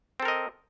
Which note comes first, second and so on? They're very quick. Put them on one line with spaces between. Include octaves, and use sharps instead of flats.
C4 A4 A#4 D#5